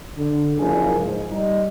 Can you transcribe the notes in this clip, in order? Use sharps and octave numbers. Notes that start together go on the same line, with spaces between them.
D3
F#1 F3 G#4 A#4 G#5
G#2
G3 D#4